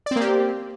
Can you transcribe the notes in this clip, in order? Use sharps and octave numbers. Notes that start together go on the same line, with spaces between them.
A#3 C4 G4 D5